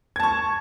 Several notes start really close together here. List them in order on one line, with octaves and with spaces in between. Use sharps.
G#6 A5 C#6